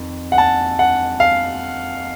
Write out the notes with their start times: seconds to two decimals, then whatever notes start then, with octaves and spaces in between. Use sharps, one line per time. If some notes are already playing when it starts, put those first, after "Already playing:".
Already playing: F2 D#3
0.32 F#5
0.38 A5
0.79 F#5
1.20 F5